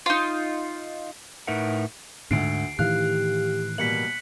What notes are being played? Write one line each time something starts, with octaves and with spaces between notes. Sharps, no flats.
D#4 F4
A2 D#4 A#4 B4 E5 F#5
D2 G#2 D3 C7 D7
A2 D#3 E3 G4 F5 F#6
B2 G3 A#3 B6 C#7 F#7